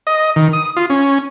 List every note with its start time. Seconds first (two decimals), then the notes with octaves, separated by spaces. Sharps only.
0.07 D#5
0.36 D#3
0.53 D#6
0.77 F4
0.90 C#4